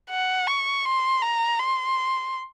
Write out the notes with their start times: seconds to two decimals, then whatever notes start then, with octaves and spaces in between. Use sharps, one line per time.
0.10 F#5
0.47 C#6
0.85 C6
1.22 A#5
1.59 C6